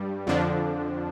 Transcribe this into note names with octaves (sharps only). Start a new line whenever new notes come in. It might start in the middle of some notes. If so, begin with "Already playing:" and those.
Already playing: G2 G3
F2 D3 F3 D4